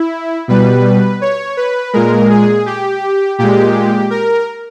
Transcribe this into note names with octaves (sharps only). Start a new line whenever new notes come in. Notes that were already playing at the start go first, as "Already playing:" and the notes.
Already playing: E4
B2 G3 B4
C#5
B4
A#2 G#3 A#4
G#4
G4
A#2 G#3 G4
A#4